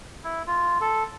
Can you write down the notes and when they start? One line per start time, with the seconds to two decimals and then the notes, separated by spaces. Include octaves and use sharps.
0.24 E4
0.47 F4
0.81 A4